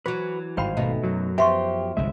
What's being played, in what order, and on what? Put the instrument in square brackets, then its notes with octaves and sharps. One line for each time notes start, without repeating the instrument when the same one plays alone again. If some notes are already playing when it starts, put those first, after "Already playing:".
[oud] E3 F#3 [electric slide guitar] F#4 B4
[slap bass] G#1 [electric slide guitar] G2 C5 F5 [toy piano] G5 B5
[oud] B2 A3 D#4
[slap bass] F#2 [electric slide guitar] F#3
[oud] F3 B3 [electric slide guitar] G4 [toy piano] E5 C6 C#6
[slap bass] G1 C2 G#3 [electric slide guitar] E5